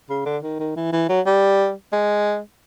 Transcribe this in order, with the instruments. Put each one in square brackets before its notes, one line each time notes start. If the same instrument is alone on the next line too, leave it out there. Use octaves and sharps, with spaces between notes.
[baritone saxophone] C#3
D3
D#3
D#3
E3
E3
F#3
G3
G#3